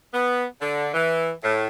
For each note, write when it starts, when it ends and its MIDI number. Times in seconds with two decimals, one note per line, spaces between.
0.12 0.44 59
0.60 0.87 50
0.92 1.30 52
1.42 1.67 45